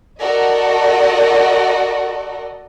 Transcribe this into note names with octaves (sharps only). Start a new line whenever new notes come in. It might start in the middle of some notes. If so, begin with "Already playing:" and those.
F#4 A4 A#4 D5 D#5